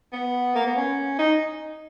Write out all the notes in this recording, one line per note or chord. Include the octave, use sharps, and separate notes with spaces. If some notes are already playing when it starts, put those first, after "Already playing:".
B3
A#3
B3
C#4
D#4